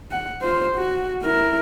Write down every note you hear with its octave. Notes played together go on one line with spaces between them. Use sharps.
F#5
F4 C5
F#4
E4 A#4